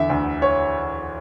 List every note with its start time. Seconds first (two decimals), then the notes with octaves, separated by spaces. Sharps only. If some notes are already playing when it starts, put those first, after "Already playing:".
Already playing: E2 D3 E5
0.10 D2
0.42 C#5